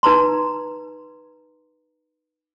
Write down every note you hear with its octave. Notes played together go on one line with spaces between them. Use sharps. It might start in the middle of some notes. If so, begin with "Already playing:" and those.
D#4 B4 A5 A#5 C6